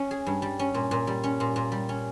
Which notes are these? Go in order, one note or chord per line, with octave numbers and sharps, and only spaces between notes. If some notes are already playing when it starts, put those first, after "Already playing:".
Already playing: C#4
G#4
G2
G3
C#4
A#2
A#2
G3
C#4
A#2
A#2
G3
C#4